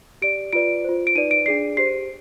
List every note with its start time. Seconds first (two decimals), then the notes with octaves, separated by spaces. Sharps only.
0.22 G4 D5 D7
0.53 F4 B4 D5 D7
0.84 F4 C5
1.07 D7
1.15 D#4 B4 D5 D#7
1.31 D7
1.46 D4 G#4 D5 C7
1.77 G4 C5 C7